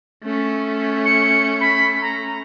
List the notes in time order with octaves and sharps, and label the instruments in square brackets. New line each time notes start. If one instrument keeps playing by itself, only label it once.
[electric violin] A3 C#4
[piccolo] C#7
B5
A#5